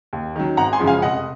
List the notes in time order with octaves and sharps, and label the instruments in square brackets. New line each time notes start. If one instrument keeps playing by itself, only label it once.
[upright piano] D#2
D#3 F#3
G#1 F#5 A#5
G#5 C6
F#2 C#3 F3 G#3
F5 G#5
F1 D#5 F#5